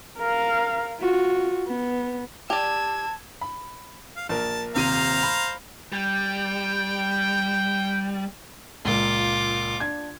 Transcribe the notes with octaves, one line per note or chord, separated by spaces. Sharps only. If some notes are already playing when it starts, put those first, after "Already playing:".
A#4 F5
F4 F#4
B3
G4 D5 A5 E6 G#6
B5
F5
A#1 A#4 A5
D#1 C3 C5 F5 A#5 D#7
B5
G3 G5
C#2 A#2 A#3 F4 D6
D4 G#6